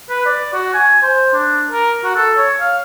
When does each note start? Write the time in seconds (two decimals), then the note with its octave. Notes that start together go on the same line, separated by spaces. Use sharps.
0.10 B4
0.26 D5
0.53 F#4
0.74 G#5
1.03 C5
1.33 D4
1.71 A#4
2.04 F#4
2.16 A4
2.38 C#5
2.60 F5